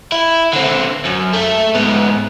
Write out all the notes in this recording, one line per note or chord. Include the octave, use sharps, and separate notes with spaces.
E4
D3 C4
F#2
A3 E5
G#2 B3